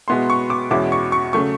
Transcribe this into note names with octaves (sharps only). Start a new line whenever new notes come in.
B2 G#3 B3 E4 C6
C#6
D6
E2 B2 G#3 C#4 E4 D6
C#6
C#6
C#3 F#3 A3 C#6